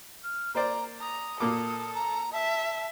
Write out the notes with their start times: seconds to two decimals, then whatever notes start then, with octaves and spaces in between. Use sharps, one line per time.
0.23 F6
0.55 A#3 C5 D5 A#5
1.00 A#5 D#6
1.40 A#2 A#3 A4 D6
1.94 A#5
2.32 E5 A5